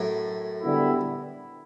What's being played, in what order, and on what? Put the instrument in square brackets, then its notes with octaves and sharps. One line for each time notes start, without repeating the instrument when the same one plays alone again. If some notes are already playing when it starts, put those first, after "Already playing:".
Already playing: [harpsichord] F#2 A2
[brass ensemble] D3 G3 B3 E4